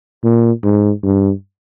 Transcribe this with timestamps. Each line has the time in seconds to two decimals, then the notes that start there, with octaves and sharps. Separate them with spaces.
0.24 A#2
0.64 G#2
1.03 G2